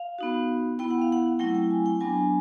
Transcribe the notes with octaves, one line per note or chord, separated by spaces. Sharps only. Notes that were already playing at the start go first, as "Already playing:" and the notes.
Already playing: F5
B3 D#4 F#4
B3 E4 G5
F#5
F5
F#5
F#3 A3 C4 E4 G5
G5
G#5
G5
F#3 B3 D4 G#5